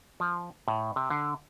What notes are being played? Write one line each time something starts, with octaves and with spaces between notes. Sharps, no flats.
F3
A2
C3
D3